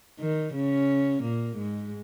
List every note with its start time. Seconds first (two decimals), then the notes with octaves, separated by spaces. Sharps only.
0.20 D#3
0.54 C#3 C#4
1.23 A#2 A#3
1.57 G#2 G#3